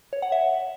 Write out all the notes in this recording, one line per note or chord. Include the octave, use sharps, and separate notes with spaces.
C#5
F#5
E5